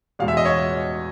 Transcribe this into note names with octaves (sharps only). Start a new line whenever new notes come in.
E2 B2 G#3 F5
E5
D#5
C#5